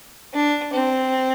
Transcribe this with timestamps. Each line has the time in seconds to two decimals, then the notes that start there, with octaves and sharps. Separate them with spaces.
0.34 D4
0.73 C4